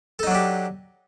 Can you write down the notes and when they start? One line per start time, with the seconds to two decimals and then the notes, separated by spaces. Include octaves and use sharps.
0.19 A4
0.23 D#4
0.27 F#3
0.31 D4
0.35 G4